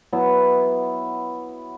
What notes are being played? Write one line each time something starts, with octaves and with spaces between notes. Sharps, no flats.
F#3 B3 E4